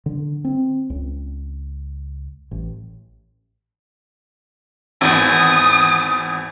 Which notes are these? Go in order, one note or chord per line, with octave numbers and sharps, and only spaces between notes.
D3
C4
C#2
A1
G#1 E2 D#6